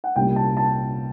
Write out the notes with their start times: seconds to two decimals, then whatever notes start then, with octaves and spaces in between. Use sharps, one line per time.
0.04 F#5
0.16 C2 A#2 G3 A#3 C#4 G5
0.36 A5
0.57 A5